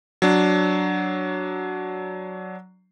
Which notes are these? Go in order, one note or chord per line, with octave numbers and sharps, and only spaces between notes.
F#3 D4